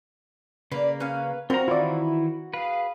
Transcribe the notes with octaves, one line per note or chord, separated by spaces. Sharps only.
C#3 A#3 B4 D5
C#4 B4 F5
C4 F4 F#4 A#4 A#5
D#3 E3 E4 F4 D5
G#4 B4 F5